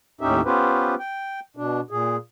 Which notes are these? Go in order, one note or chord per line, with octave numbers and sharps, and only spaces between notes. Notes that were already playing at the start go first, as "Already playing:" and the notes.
D#2 A2 C#4 D#4 G4 E5
B3 C#4 F4 G4 B4 C5
G5
B2 D4
A#2 G#4